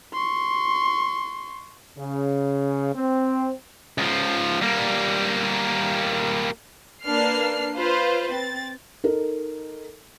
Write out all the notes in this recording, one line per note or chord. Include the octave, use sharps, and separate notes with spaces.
C6 C#6
C#3
C4
C#2 F3
G3 A#3
A#3 D4 B4 F6 C7
F4 B4 C5
C4 A6
D#4 A4 A#4